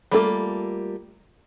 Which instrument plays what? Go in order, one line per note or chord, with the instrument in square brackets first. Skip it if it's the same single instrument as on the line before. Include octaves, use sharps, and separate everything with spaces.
[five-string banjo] G3 A3 A#3 F4 A4